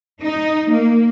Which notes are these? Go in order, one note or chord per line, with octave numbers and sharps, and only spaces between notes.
D#4
A#3